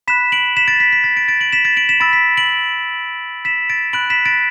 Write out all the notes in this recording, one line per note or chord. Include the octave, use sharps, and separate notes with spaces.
B5 F#6 B6 E7
D7 F#7
B6 E7
A6 D7
B6
B6
A6
A6 D7
A6 D7
D7 F#7
B6 E7
A6 D7
D7 F#7
B6 E7
B5 E6 A6 D7
B6
D7 F#7
B6 E7
A6 D7
B5 F#6 D7 F#7
B6 E7
A6 D7